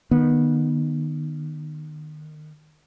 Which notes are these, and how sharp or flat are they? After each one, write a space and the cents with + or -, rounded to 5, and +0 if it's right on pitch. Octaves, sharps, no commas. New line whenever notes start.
D#3 -30 B3 -25